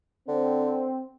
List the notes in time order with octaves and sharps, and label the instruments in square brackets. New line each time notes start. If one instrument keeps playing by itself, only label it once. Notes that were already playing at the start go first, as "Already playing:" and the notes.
[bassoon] D3 [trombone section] C4